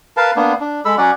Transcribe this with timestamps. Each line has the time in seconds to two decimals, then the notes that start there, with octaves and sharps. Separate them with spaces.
0.17 A#4 B4 F5 A5
0.36 A#3 B3 D4
0.60 D4
0.85 G#3 A4 B5 E6
0.98 F#3 C#4 D5 F#5